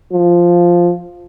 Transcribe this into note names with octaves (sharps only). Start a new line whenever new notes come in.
F3